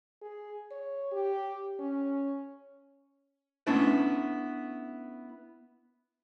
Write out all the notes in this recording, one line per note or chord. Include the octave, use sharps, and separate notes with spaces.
G#4
C#5
G4
C#4
A3 B3 C#4 D4 E4 B4